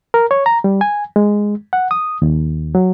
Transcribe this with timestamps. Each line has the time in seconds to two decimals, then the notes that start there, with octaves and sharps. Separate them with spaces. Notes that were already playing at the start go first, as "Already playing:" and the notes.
0.14 A#4
0.31 C#5
0.46 A#5
0.64 G3
0.81 G#5
1.16 G#3
1.73 F#5
1.91 D#6
2.22 D#2
2.75 F#3